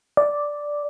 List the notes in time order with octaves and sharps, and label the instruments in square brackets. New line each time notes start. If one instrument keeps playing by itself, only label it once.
[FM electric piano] D5